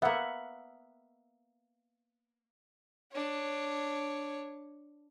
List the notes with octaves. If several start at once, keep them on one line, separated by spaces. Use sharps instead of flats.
A#3 B3 E5 F#5
D4 C#5